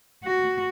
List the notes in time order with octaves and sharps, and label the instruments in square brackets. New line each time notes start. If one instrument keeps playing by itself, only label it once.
[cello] F#4